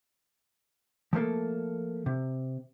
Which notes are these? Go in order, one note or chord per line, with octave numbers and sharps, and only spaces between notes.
F3 A3 A#3 A4
C3